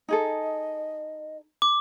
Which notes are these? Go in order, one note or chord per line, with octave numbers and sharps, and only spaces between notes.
D#4 G#4 A4 D#5
D6